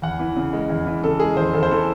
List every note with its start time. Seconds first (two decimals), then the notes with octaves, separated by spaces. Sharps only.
0.02 E2 F#5
0.19 E3
0.36 C#3
0.53 G#3
0.70 E2
0.86 E3
1.03 C#3 A4
1.20 G#3 G#4
1.37 E2 C5
1.53 E2 A4
1.63 C5
1.71 E3 A4